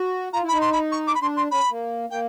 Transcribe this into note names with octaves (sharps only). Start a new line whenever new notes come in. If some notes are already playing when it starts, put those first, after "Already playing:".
Already playing: F#4
F4 A#5
E4
D#4 B5
C6
B5
C#6
D6
B5
D4 C6
C6
C#4 B5
A#3
A#3 G5